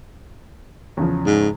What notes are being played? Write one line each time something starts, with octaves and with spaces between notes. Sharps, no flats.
E2 C#3 F3
G#2